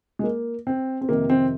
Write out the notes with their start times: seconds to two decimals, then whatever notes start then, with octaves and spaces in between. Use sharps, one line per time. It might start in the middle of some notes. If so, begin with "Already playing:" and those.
0.19 G#3
0.24 A#3
0.67 C4
1.01 C4
1.09 F2 C3 D#3 A#3
1.30 C4